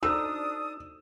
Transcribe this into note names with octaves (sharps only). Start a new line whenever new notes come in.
D4 D#4 F#4 A4 C5 D#6 E6